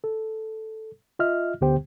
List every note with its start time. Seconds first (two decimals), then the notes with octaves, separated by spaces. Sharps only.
0.04 A4
1.19 F4 D#5 E5 F6
1.61 D2 D3 B3 G4 C5 G5